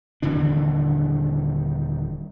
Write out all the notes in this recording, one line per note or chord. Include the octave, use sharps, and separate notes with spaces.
D#1 D3 E3 D4